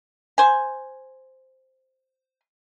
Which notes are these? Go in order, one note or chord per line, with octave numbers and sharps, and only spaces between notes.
C5 G#5